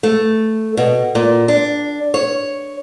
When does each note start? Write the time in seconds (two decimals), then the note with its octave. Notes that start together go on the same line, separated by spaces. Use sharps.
0.03 A3
0.77 B2
1.15 A#2
1.48 D4
2.14 C#5